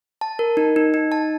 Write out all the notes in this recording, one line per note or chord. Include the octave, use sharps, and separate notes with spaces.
A5
A#4
D#4
D#4
D#4
A5